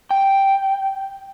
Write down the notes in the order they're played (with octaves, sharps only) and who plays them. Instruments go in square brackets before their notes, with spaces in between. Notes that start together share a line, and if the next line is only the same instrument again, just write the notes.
[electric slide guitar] G5